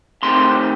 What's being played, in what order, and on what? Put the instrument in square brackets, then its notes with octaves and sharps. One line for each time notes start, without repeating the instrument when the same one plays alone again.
[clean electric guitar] F2 C3 D#3 A3 C4 C6